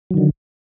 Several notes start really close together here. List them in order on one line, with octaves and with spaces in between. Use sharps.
F#3 D#3 D3